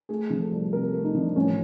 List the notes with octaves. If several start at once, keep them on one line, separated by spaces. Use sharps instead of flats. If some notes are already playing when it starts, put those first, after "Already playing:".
A3 G#4
F3
A4
C2
C3 A#4
A4
A3
D#4
F3
D4
A1 C#4